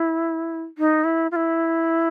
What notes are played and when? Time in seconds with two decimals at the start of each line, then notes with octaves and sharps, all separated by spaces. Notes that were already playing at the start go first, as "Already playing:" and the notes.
Already playing: E4
0.78 D#4
1.04 E4
1.31 F4
1.36 E4